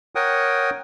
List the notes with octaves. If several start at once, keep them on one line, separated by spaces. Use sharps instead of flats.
A#4 C#5 F#5 G5 D#6